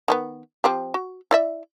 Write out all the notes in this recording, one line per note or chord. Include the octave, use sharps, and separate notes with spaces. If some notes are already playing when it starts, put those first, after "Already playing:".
D#3 G#3 B3
F3 C4 G4
F#4
E4 D5 E5